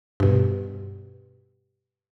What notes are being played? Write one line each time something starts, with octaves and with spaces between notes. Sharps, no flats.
G2 B2